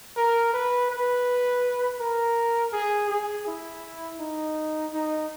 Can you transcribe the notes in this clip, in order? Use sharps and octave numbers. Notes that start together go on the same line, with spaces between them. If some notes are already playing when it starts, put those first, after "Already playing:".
A#4
B4
B4
A#4
G#4
G#4
E4
D#4
D#4